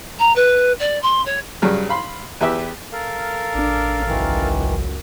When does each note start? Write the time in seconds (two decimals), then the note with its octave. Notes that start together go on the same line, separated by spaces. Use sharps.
0.19 A#5
0.35 B4
0.79 D5
1.02 C6
1.26 C#5
1.62 G2 C#3 F#3 G3 F6
1.89 F5 B5 C6
2.41 E2 G4 B4 E5 E6
2.93 A4 A#4 F5
3.55 A1 D4
4.08 C#2 F#2 D#3 E3